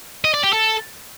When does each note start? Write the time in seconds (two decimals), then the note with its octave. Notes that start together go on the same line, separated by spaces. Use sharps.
0.25 D#5
0.34 D5
0.44 G4
0.53 A4